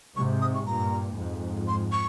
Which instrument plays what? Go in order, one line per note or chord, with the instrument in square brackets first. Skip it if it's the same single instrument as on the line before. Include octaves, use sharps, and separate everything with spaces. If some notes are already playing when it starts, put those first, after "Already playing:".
[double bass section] G#2 C3 [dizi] C#6
[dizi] D#6
C#6
[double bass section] G2 A#2 [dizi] A#5
[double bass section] F2 G#2
[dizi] C6
C#6